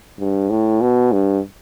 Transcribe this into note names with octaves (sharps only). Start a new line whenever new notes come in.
G2
A2
B2
G2